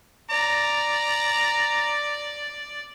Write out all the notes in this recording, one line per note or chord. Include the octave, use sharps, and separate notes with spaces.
D5 A#5